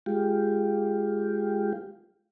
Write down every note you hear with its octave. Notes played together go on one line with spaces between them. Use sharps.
G#3 F4 G4